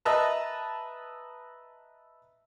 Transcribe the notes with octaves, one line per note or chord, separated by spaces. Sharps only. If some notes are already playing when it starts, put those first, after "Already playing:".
B4 D#5 E5 A5 A#5